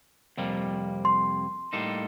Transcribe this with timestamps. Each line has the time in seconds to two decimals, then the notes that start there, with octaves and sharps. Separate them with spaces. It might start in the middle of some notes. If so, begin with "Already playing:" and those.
0.37 F2 C3 G3 A#3
1.05 C6
1.73 A2 G3 A#3 D#4 A4